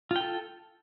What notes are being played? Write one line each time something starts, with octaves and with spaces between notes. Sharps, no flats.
F4 A4 G5